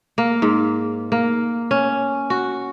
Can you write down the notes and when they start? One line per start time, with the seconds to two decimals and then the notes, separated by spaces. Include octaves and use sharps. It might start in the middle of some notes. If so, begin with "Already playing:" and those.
0.18 A#3
0.42 G#2
1.12 A#3
1.71 C#4
2.30 F#4